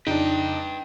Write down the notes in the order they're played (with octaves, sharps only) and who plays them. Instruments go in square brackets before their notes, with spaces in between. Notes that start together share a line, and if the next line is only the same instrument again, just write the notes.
[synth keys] F2 C#3 [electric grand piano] D4 D#4 [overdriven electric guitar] B4 G5